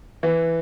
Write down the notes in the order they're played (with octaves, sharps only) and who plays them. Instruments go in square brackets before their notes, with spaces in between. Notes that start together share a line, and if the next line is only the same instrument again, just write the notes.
[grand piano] E3